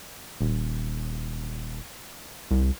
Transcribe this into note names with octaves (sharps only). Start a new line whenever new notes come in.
D#1
C2